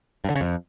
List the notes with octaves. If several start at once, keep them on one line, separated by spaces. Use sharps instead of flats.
G2
D3
C#3
F2